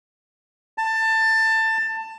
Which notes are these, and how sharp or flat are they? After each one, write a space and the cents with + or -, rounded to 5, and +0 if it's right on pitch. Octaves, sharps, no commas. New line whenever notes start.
A5 +20